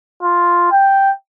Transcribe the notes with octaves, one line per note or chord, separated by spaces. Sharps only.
F4
G5